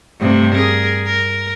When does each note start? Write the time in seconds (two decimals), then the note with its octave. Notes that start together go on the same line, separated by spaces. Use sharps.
0.19 G2 C3 A3
0.54 G#4 A#4
1.06 A#4